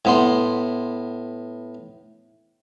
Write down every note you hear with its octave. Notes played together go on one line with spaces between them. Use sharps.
A2 B3 C6